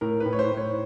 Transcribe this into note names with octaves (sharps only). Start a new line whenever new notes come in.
A2 A#4
B4
A2
C#5
C5
A2
C#5